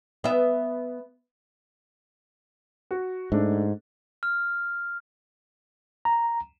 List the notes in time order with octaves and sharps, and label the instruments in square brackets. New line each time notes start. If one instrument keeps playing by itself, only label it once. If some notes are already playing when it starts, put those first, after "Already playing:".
[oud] B3 E5
[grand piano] F#4
[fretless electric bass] G#2 [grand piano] A3 D4
[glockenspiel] F6
[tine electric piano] A#5